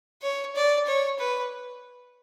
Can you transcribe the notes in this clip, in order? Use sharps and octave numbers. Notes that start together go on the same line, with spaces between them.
C#5
D5
C#5
B4